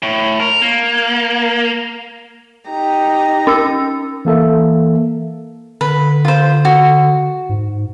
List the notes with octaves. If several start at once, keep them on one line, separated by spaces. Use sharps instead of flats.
A2
A#4
A#3
D#4 G4 A#5
C#4 E6
E3 A#3 A4 E5
D3 B4
F4 C5
F#4
G#2